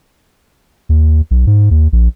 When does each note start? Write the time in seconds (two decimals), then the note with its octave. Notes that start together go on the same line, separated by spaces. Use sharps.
0.89 D#2
1.31 B1
1.47 G#2
1.71 D#2
1.92 A#1